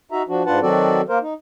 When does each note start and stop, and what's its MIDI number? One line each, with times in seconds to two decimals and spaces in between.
0.12 0.22 63
0.12 0.22 66
0.12 0.22 76
0.12 0.22 82
0.28 0.43 53
0.28 0.43 62
0.28 0.43 66
0.46 0.59 44
0.46 0.59 62
0.46 0.59 65
0.46 0.59 71
0.46 0.59 78
0.46 0.59 81
0.62 1.01 51
0.62 1.01 54
0.62 1.01 60
0.62 1.01 66
0.62 1.01 69
0.62 1.01 74
1.09 1.18 58
1.09 1.18 70
1.09 1.18 72
1.22 1.34 63